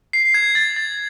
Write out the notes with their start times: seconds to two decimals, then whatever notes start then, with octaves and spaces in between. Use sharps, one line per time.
0.13 C7
0.34 G#6
0.55 A6
0.76 A6